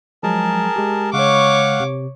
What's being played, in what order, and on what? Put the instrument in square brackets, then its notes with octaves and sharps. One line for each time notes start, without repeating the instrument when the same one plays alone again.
[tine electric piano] F3 F#3 G#3 [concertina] G#4 A#4 A5
[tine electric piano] G#3 G4
[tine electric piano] C#3 G#3 [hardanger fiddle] C#5 D6 [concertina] F5 F#5 C#6
[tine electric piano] C3